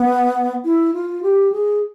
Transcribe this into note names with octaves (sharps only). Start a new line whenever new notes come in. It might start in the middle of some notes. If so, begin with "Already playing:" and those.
Already playing: B3
E4
F4
G4
G#4